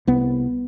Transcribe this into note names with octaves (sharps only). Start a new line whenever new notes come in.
C2 B3